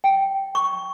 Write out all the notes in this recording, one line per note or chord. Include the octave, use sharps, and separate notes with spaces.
G5
C#6